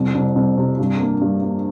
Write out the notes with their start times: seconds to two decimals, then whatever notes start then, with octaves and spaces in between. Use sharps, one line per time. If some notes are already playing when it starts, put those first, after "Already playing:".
Already playing: C2 F2 C3
0.15 C2
0.36 C2
0.57 C3
0.79 G2
1.00 A#3
1.21 G2
1.42 A#3